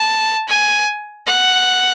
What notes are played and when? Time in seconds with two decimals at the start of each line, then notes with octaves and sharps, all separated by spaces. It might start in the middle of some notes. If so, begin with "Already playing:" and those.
Already playing: A5
0.49 G#5
1.27 F#5